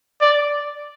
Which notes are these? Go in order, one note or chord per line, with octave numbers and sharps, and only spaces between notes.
D5